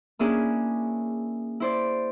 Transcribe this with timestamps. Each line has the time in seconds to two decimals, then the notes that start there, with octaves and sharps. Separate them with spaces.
0.19 A#3 C#4 D4 E4 G#4
1.60 E4 C5 D5